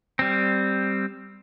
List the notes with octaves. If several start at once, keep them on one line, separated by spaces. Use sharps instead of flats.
G3 C4